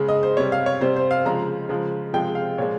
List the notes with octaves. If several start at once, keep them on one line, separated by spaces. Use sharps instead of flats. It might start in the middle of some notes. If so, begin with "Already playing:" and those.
Already playing: C#3 G#3
D#5
C5
C3 G3 C#5
F5
C#5
C3 G3 C5
C5
F5
C#3 F3 G#3 A#5
C#3 F3 G#3
C3 F3 G#3 G5
F5
A#2 F3 G#3 C#5